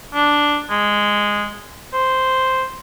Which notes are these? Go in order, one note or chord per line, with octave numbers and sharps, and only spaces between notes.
D4
G#3
C5